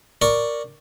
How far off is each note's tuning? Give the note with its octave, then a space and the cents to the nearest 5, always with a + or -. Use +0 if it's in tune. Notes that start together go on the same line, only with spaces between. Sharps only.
A#4 +0 D5 +0 C#6 +0